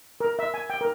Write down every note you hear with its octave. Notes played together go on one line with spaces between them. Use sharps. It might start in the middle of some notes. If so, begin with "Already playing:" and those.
A#4
E5
G#5
G5
A#4